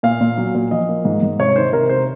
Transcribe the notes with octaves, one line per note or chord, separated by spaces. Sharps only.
A#2 F5
A#2
F#3
A#2
F3 D#5
A#3
G#2
G#2
C3 C#5
D#3 C5
C3 A#4
C3 C5